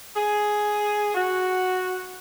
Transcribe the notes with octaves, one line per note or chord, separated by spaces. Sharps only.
G#4
F#4